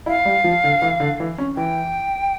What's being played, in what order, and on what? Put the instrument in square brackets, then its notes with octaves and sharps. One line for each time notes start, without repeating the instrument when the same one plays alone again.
[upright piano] E4 [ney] F5
[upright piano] G3
F3
D3
E3
D3
E3
C#4
[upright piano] E3 [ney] G5